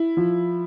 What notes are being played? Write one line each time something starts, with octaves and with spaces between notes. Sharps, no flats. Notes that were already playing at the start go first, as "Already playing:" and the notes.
Already playing: E4
F3